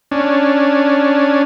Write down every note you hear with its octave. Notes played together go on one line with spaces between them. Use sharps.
C#4 D4